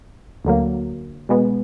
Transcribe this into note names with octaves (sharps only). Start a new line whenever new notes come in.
D2 D3 F#3 A#3
B2 G#3 B3